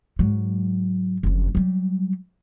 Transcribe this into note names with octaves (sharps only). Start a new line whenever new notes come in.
G#2 F#3
F#1 F2
F#3 G3